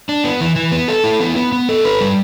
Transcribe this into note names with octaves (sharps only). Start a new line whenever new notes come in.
D4
B3
E3
E3
B3
A4
E4
B3
B3
B3
A4
B4
G3